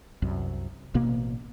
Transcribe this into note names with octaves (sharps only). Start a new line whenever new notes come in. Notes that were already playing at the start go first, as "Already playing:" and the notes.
C2 F#2
A1 B2 A#3